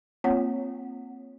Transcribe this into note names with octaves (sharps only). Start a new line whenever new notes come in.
A#3 C4 F4 C#5 F#5